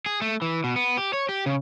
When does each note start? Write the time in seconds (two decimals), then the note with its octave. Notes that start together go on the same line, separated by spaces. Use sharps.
0.06 G#4
0.22 A3
0.42 E3
0.64 B2
0.76 B3
0.97 G4
1.13 C#5
1.29 G4
1.46 C#3